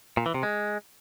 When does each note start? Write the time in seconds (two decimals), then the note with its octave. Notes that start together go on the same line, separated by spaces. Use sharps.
0.17 A#2
0.26 E3
0.34 C3
0.43 G#3